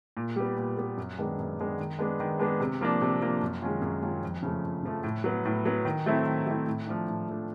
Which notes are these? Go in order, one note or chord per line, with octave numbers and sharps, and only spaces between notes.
A#2
G3 B3
A#2
G3 B3
F#2
D#3 G#3 B3 D4
F#2
D#3 G#3 B3 D4
D#3
G#3 B3 D4
D#3
G#3 B3 D4
C3
F3 A#3 D4
C3
F3 A#3 D4
F#2
D#3 G#3 C#4 F4
F#2
D#3 G#3 C#4 F4
F2
C#3 F3 A3
F2
C#3 F3 A3
A2
F#3 B3
A2
F#3 B3
D#3
F#3 A3 C4 E4
D#3
F#3 A3 C4 E4
A2
F3 A3 D4
A2
F3 A3 D4